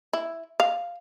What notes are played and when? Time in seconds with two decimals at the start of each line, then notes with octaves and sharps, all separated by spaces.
0.13 E4
0.60 F5